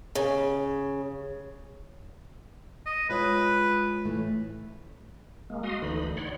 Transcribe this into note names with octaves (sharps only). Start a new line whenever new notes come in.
C#3
D#5
G#3 F4 B4 C#5
A2 E3 A3
G#3 A#3
F#4 D#5 F5 C6 D#6
D2 D3 E3 D#4 B5
C#5 D5 F#5 B5 C6